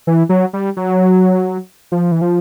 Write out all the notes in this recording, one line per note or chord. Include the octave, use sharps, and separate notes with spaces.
E3
F#3
G3
F#3
F3
E3
F3